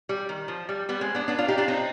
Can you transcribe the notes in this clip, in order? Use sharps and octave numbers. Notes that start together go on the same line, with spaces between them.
G3
D#3
F3
G3
G3 B3
G#3 C4
B3 D4
B3 D4
D4 F4
D#4 G4
D4 F4
C4 D#4